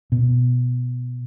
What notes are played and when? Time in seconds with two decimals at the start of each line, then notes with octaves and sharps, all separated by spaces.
0.12 B2